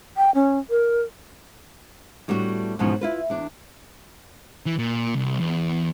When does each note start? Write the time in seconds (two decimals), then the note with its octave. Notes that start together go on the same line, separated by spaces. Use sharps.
0.17 G5
0.35 C#4
0.70 A#4
2.28 A2 G3 B3 D4 F#4
2.79 E2 G#2 B2 F3 C#4 F#5
3.01 E4 F4 B4
3.30 E2 D4
4.66 E3
4.79 A#2
5.15 C2
5.40 E2